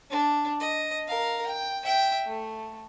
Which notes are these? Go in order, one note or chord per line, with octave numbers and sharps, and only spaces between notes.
D4
D#5
A#4 F5
G5
E5 G5
A3